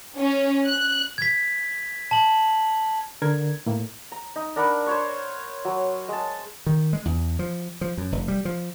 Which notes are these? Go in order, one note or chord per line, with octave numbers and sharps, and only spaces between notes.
C#4
F#6
G#6 B6
A5 F#7
D3 A#4 G#6
A2 A#3
A#5
D#4
D4 A#4 F#5 B5
C5 C#5 C#6
F#3
G#3 A5
D#3
G#3
E2
F3
F3
F#2
F1
G3
F3